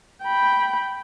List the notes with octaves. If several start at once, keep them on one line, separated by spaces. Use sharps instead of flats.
G5 B5